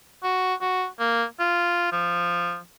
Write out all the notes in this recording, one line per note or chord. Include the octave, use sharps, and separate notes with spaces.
F#4
F#4
A#3
F4
F3